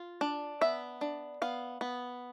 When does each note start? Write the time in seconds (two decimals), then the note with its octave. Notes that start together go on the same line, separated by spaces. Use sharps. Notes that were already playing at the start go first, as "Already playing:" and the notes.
Already playing: F4
0.21 D4
0.61 B3 E5
1.01 D4
1.42 B3 F5
1.81 B3